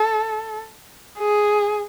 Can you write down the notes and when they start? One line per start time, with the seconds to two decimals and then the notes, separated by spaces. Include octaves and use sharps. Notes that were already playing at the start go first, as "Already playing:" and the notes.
Already playing: A4
1.18 G#4